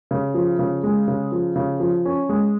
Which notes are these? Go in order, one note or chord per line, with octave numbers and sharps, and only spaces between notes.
C#3
F3
C#3
G#3
C#3
F3
C#3
F3
C#4
G#3